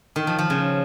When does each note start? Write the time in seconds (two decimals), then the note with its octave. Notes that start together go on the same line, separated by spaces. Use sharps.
0.16 D#3
0.27 F3
0.39 F3
0.50 C#3